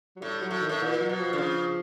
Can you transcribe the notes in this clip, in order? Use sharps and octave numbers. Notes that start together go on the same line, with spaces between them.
F#3
A2 G3
F#3
A2
D#3
A2
A#2 E3
F#3
B2
F3
D3
C#3